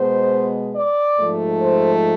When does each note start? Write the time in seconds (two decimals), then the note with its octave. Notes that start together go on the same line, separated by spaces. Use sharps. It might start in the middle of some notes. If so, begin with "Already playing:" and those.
Already playing: B2 G#3 B3 C5
0.75 D5
1.18 G#2 F3 A3
1.61 C5